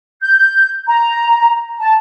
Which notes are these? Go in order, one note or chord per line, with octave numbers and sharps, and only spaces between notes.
G6
A#5
A5